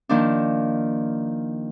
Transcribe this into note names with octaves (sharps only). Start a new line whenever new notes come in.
D#3 F3 A#3 D4